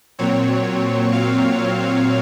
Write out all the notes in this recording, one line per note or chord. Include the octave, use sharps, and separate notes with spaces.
A#2 F#3 C4 C#5
F5